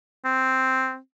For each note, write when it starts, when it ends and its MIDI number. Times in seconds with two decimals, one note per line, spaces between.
0.25 0.98 60